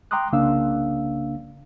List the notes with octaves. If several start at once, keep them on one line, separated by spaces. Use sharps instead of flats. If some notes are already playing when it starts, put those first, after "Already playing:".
G5 A#5 C6 D6 D#6 F#6
C2 C#3 A#3 D4 F5 E6